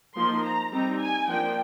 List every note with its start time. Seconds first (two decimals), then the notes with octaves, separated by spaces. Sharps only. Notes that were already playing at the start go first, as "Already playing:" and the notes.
0.16 F3 A#3 D#4 C6
0.45 A#5
0.72 G3 C4 D#4 A#5
1.00 G#5
1.28 F3 A#3 D4 G5